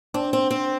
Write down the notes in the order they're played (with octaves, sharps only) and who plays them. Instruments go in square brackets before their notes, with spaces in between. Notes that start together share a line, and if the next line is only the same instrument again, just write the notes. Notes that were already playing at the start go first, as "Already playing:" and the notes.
[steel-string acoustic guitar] C4 [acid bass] D4
[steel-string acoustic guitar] C4
C4